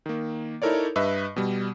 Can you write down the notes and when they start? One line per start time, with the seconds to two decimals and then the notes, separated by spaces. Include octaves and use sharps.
0.06 D#3 A#3
0.62 D#4 E4 A4 A#4 C#5 D5
0.96 G2 B4 D#5 E5
1.36 B2 G3